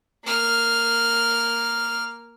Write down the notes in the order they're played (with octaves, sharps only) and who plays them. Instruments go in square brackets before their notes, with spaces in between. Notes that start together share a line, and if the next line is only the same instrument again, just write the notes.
[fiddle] A#3 F6